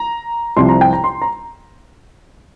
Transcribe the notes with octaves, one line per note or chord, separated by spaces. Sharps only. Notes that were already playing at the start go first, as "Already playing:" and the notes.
Already playing: A#5
C2 C3 F3 C6
A#5
G5
A#5
C6
A#5